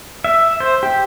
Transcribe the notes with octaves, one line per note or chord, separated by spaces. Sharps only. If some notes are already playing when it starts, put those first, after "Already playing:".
E5
C5
G4